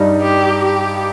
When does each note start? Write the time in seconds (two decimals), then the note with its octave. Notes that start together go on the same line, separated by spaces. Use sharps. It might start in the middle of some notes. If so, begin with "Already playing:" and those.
Already playing: G2 G3 D#4
0.21 G4
0.64 G4